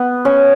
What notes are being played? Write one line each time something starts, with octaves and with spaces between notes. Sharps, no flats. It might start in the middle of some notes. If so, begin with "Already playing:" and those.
Already playing: B3
C#4